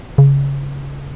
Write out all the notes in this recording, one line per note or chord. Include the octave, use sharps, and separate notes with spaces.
C#3